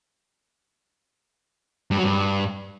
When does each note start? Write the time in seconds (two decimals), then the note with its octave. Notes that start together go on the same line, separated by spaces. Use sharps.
1.91 G2
1.97 F#3
2.04 G2